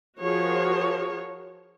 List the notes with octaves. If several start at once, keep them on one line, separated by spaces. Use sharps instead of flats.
F3 F#4 G#4 A#4 C#5